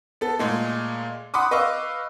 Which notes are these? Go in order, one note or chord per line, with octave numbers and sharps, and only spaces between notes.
B3 A4
A#2 G#3 A3
F#5 B5 C6 D6 D#6
B4 D#5 F5 C#6 D6 E6